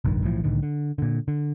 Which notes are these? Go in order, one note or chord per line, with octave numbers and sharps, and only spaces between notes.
F1 A#1 G2 D#3
B1 A2 E3 F3
C2 A2 D3 D#3
D3
A#2 D3
D3